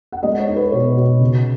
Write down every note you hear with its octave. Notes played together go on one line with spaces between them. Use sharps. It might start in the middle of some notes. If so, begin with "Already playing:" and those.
F#5
G#3 D#5
C#5
D#4
B4
B2 C#5
B2
C#3